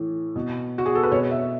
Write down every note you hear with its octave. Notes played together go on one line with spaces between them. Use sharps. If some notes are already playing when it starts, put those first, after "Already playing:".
Already playing: A2 E3
B2
F#4
G#4
A4
B4
B2 C#5
E5